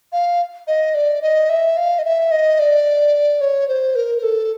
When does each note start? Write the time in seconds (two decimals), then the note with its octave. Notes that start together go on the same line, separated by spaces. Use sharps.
0.12 F5
0.67 D#5
0.94 D5
1.22 D#5
1.49 E5
1.77 F5
1.99 D#5
2.05 E5
2.31 D#5
2.59 D5
3.41 C#5
3.68 C5
3.95 A#4
4.18 A#4
4.23 A4